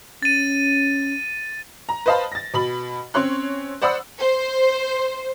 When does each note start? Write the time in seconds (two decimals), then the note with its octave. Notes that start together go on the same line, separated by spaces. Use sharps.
0.22 C#4 A6 D#7
1.89 A#5
2.06 B4 C5 D#5 F5 A5 B5
2.32 A6 A#6
2.54 B2 B5 F#7
3.14 C4 C#4 C#5 C6 F#6
3.82 C5 D5 F#5 B5 D#6 E6
4.19 C5